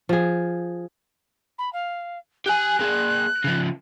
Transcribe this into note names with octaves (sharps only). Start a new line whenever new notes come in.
F3 G#4
B5
F5
G4 G#5 F#6
A#3 G#4
C#3 F3